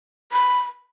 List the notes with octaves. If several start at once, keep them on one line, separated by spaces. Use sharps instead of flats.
B5